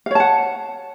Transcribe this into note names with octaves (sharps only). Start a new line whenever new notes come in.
C#5 F5 F#5 A5